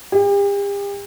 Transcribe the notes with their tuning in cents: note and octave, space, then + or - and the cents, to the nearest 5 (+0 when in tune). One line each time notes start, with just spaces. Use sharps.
G4 +40